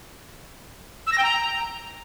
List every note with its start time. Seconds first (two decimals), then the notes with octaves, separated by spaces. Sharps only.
1.07 E6
1.12 A#6
1.18 G5
1.23 A#5